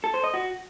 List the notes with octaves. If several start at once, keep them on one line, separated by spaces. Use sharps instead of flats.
A4
C5
D#5
F#4